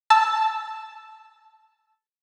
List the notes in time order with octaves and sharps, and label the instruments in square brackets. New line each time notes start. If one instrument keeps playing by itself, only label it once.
[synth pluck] A5 E6